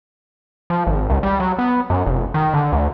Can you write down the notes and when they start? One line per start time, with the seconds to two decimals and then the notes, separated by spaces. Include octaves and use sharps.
0.70 F3
0.87 G#1
1.10 C#2
1.23 G3
1.40 F#3
1.58 B3
1.90 F#2
2.06 F1
2.34 D#3
2.54 D3
2.72 D2